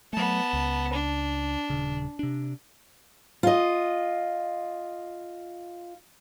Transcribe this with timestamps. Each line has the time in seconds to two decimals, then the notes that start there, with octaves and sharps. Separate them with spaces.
0.13 F#3 A3 B3 A5
0.53 C#2
0.93 D4
1.70 D#1 C#3
2.19 C3 D4
3.43 F4 D#5